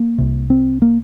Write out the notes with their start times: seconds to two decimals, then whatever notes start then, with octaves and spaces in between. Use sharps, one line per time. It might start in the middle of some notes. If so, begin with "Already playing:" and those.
Already playing: A#3
0.18 C2 C3
0.50 C4
0.82 A#3